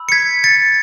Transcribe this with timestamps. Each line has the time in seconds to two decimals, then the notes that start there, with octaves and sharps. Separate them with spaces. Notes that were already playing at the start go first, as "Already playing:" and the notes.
Already playing: B5 E6
0.09 C#7
0.12 G#6 B6
0.44 A6 C#7